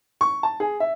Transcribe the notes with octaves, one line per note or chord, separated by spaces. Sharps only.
C#6
A5
G#4
E5